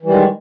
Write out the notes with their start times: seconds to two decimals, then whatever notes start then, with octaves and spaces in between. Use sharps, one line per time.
0.03 E3
0.05 G3
0.08 D#3
0.11 G#3